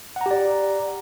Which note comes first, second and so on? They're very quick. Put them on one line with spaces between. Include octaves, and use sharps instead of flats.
F#5 A#5 G4 D5